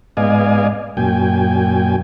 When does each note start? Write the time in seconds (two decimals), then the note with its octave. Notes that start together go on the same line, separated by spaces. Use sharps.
0.17 G#2 B3 D5 D#5 F5 G#5
0.97 F#2 A#2 G5 G#5